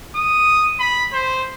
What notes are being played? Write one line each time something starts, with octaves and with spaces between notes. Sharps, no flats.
D#6
B5
C5